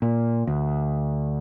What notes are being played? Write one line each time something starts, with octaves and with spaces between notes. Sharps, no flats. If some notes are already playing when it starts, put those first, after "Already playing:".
A#2
D2